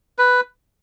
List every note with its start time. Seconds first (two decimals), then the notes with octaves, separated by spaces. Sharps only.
0.19 B4